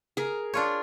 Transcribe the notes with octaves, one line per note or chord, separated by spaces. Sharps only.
G#4 A#4
D4 F4 C#5